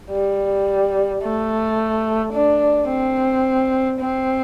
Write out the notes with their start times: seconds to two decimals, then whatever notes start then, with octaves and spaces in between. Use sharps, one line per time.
0.11 G3
1.22 A3
2.33 D4
2.89 C4
4.00 C4